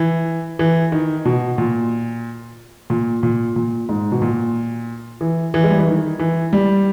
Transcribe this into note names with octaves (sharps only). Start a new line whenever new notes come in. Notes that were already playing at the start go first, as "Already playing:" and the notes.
Already playing: E3
E3
D#3
B2
A#2
A#2
A#2
A#2
G#2
B2
A#2
E3
E3
G#3
G3
E3
D#3
E3
G3